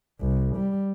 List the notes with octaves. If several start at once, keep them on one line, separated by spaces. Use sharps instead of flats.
C2
G3